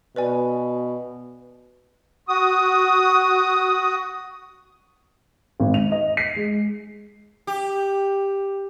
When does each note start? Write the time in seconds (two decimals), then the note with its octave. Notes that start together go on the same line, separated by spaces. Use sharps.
0.16 B2 B4 D5 G#5
2.28 F#4 D#6
5.60 G#1
5.74 F7
5.92 D#5
6.17 C7
6.36 G#3
7.47 G4